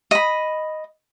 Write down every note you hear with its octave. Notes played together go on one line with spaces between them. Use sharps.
D#5 B5